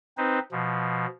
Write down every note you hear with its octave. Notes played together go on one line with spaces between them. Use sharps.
C4 D#4 B4 C5
B2 F3